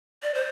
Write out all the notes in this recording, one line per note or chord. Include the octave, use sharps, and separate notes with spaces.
D5
C5